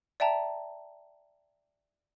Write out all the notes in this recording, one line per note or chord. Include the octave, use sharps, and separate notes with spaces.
D5 E5 G5 A5 A#5